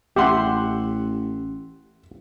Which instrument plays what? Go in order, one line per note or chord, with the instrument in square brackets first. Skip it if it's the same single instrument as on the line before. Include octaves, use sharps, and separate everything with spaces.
[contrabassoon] A1 [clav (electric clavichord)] G4 [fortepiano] E5 F#5 C6